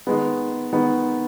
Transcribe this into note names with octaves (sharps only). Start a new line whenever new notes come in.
D#3 G#3 B3
D#3 G#3 B3